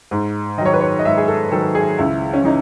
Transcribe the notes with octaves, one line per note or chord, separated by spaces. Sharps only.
G#2
D#3 F#3 C#5 D#5
B4
C#5
D#5
G#2 E5
G#4
A4
D#3 F#3 A4
G#4
C#2 E4
C#4
C#3 E3 D#4